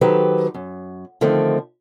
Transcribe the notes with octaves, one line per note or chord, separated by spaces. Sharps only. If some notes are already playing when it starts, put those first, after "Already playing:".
D#3 F#3 G4 A4 B4 C5
F#2
D3 D#3 F3 A3 C4